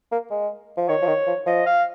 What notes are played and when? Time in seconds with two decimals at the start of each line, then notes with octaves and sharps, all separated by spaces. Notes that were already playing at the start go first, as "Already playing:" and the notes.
0.12 A#3
0.31 G#3
0.77 F3
0.89 D#3 C#5
1.02 F3
1.07 D#3
1.27 F3
1.46 F3 D#5
1.66 F5